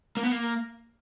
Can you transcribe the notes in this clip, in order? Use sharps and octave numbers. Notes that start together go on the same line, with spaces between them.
A#3
B3
A#3